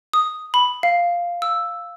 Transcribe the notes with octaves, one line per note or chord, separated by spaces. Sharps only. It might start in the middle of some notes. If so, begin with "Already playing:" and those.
D#6
B5
F5
E6